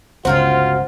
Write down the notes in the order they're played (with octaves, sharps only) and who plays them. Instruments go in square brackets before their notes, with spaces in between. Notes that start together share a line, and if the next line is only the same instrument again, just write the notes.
[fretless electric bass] G1 C#2 C#3 [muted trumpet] F4 [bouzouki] F#4 A#4 G5 [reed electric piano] C5